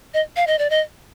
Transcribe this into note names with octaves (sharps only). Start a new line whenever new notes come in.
D#5
F5
D#5
D5
D#5